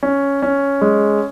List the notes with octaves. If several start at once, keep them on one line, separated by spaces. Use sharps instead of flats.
C#4
C#4
G#3